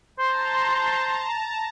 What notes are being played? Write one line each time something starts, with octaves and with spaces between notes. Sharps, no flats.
C5 A5 A#5 C6